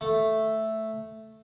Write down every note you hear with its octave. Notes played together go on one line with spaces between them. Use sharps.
A3